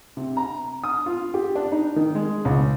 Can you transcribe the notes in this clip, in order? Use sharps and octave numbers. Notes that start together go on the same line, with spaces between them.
C3
A#5
D#6
F4
G4
D4
D#4
D#3
G#3
C#2